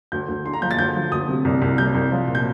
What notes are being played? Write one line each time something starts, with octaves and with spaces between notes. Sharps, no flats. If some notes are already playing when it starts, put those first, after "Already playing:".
D2 G6
D2
D3 C6
A#5
F3 G6
A6
D2 G6
F3
D2 D#6
C3
C2
C2
C2 G6
C2
F3
A#2
G6